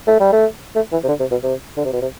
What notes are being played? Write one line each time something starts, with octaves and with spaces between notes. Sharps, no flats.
A3
G3
A3
A3
E3
C3
D3
C3
B2
C3
D3
C3
B2
C3